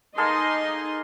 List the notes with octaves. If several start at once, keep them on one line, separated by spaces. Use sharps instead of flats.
A#3 D#4 G#4 A4 D#5 C6